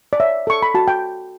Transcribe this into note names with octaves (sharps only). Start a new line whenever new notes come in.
D5
C#5 E5
A4 C#6
B5
F#4 A5
G5